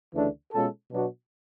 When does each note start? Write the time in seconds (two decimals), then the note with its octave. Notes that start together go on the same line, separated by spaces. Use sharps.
0.13 D2 C#3 E3 A3 D4
0.52 B2 G#3 C#4 F4 A4
0.91 B2 F#3 B3 D4 F#4